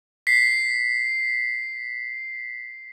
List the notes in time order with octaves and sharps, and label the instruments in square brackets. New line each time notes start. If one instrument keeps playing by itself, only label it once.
[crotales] B6 C7